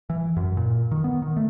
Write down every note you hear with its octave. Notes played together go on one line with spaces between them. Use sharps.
E3
F#2
A#2
D#3
B3
D#3
A3